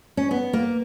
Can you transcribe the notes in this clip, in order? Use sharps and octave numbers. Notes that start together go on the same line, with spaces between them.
C#4
B3
A#3